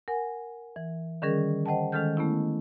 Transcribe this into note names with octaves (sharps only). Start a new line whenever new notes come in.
A#4 F#5 G#5
E3
D3 D#3 G3 C#4 G#4 A#4
C5 D#5 F#5 G5 A5
D#3 G#3 C#4 A4 F6 G6
A3 B3 C#4 E4